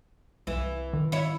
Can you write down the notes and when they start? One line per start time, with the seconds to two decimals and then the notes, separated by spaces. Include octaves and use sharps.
0.47 C2 E3
0.93 D#3
1.12 E4 C#5